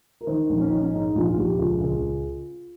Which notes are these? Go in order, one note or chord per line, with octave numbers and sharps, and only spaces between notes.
A#4
D#3 C5
A#1
C#4
D#3 D#4
C#4
G#2 D#4
A#1 F4
F4
A#1 G4
C#2 F4
C#2